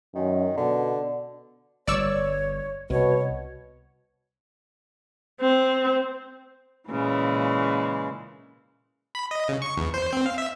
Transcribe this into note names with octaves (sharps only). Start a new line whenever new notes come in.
F#2 D#3
B2 D3
G1 G3 C#5 D5 C#6 E6
C2 B2 C#5
C4
A#2 C#3 E3 G#3
B5
D#5
C#3
C#6
E2
C5
C4
F5
E5